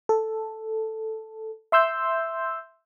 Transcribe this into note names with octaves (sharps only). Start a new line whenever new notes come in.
A4
E5 C6 E6 G6